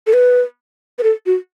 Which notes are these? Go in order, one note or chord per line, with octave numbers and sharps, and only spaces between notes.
A4
B4
B4
A4
F#4